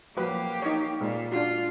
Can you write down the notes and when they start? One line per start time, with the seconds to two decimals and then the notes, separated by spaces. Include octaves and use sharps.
0.17 F3 F#3 A#3 G4 B4
0.62 D#4 C#5
1.01 A#2 G#3
1.32 D4 F4 F#4